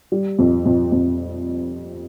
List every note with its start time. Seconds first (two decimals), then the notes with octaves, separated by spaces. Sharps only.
0.12 G3
0.39 F2
0.66 F2
0.92 F2